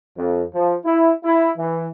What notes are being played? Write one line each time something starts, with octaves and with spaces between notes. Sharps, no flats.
F2
F3
E4
E4
E3